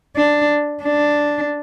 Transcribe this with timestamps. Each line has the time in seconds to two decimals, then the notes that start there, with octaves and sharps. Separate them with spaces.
0.16 D4
0.83 D4